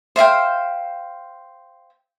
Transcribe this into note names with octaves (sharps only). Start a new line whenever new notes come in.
C5 E5 F5 G5